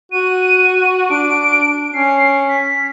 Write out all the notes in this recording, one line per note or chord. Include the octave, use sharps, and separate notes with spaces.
F#4 D#7
D4 D7
C#4 C7
B6